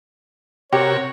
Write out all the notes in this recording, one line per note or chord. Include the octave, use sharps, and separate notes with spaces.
C3 F#4 G4 A#4 C#5